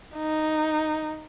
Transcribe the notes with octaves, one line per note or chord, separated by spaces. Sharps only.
D#4